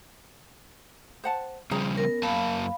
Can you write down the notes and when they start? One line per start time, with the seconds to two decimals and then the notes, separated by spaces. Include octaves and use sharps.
1.24 C5 F#5 A5
1.71 C#3 F3 G3 C#4 G#4 A#5
1.98 B3 A#4
2.23 F#2 A#3 F5 A5 B5